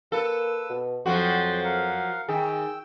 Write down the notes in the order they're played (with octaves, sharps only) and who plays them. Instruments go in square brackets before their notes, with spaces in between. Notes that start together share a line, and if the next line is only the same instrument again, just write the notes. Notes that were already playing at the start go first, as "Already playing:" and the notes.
[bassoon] A#3 [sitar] A4 [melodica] B4 E6
[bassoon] B2
[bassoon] F2 [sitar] F3 F#3 F#4 [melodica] F#5 G5 C6
[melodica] A#4 F5 F#5
[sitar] D#3 [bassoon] G#4 [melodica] G5 E6